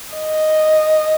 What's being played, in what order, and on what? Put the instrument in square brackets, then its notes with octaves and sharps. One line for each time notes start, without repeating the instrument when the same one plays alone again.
[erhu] D#5